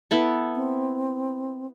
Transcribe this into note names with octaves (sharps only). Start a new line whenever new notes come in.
B3 E4 A4
C4